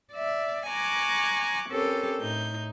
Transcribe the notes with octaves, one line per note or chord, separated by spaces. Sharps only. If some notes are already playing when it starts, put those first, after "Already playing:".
D5 E5
G#5 A#5 C#6 D6 F#6 G#6
C4 C#4 G4 A4 A#4
A2 D#4 G6